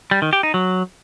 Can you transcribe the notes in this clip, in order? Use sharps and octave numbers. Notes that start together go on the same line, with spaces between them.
G3
D#3
G4
D#4
F#3